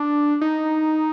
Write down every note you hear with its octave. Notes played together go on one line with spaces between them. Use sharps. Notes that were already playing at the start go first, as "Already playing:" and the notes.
Already playing: D4
D#4